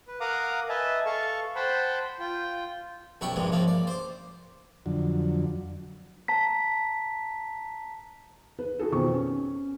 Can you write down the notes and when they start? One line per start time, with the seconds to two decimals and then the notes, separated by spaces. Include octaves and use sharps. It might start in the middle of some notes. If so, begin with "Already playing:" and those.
0.08 B4
0.20 A#4 F5 F#5 A#5 D6 D#6
0.69 B4 D#5 E5 G#5 A5
1.06 A4 F5 A5 C#6
1.55 C5 F#5 G5 A5 B5
2.19 F4 G5
3.21 C2 F#2 B2 E4 G5 C#6
3.36 A#1 G2 C3 E3 G#3
3.52 C#3 F3 A#3 C4
3.68 D5
3.87 C5 D6
4.86 F2 D3 F#3
6.28 A5 A#5 B6
8.59 B4
8.79 D#4 F#4 G#4 A4
8.91 F2 B2 D#3 C4 C#6
9.14 C#4